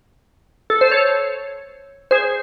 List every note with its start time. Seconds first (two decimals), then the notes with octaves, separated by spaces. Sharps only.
0.70 A4
0.81 C5
0.91 A4 C#5
2.11 G#4 C5